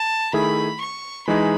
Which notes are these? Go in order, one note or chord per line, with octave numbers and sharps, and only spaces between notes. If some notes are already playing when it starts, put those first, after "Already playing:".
Already playing: A5
D#3 A3 E4 G#4 B5
C#6
E3 G#3 D#4 G#4 B5